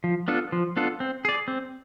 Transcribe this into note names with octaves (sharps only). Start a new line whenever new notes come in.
F3
B3 D4 F4 A4
F3
B3 D4 F4 A4
C4
G#4 D5
C4